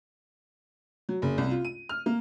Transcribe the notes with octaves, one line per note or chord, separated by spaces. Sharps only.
F#3
F#1
C2
F4
D#7
F6
A#3